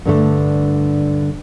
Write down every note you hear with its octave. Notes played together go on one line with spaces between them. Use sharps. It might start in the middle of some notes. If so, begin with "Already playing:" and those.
G2 D3 A3